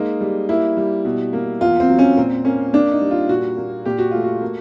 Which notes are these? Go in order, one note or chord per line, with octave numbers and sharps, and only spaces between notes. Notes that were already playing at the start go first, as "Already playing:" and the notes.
Already playing: G#3 A#3 D#4
G3
A#3 E4
G3
B2
A#3
E2 F4
C4
F#3
C#4
A#2 C4
A#3 C#4
A#3 D4
D#4
G3
F4
A#2 F#4
A#3
A#2 G4
F#4
A3 F4
F#4
A#3